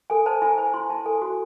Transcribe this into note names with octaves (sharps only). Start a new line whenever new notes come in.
A4 G#5
C5 A5
E4 G#5
C5 G#5
E4 C6
E4 A5
A4 G#5
F#4